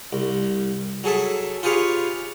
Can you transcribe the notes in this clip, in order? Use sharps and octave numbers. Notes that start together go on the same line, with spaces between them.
C2
F#3 G#4 A4 E5
F4 G4 G#4 B4 C#5 F5